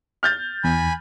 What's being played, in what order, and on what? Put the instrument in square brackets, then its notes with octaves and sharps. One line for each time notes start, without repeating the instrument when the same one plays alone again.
[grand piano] F6 G6 A6
[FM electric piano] E2 [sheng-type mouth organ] G#5 B5